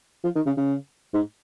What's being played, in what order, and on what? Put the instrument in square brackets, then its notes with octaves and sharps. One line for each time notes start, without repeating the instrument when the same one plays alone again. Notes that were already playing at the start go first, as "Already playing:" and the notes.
[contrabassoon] F3
D#3
C#3
C#3
G#2